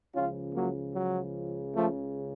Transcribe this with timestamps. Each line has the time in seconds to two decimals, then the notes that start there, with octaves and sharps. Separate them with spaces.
0.15 C#2 C#3 F3 C#4 F4
0.55 F#3 A#3
0.94 F#3
1.74 F3 A3